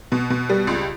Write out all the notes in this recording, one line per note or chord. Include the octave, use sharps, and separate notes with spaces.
B2
B2
G3
C#2